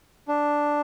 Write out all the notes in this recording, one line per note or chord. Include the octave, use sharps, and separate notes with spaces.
D4